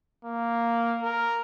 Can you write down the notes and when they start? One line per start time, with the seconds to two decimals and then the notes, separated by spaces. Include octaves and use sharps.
0.25 A#3
1.03 A#4